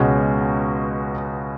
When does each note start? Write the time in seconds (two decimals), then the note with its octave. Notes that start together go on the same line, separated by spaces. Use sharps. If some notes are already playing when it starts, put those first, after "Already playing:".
Already playing: C#2 B2 G#3 C#4 F#4